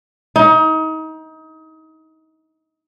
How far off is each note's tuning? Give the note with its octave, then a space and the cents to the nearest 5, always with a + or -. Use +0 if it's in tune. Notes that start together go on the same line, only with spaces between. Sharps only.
D#4 +30